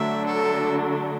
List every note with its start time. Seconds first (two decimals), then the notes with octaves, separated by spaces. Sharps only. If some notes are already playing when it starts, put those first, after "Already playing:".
Already playing: D3 F#3 A3 D4 E5
0.25 A4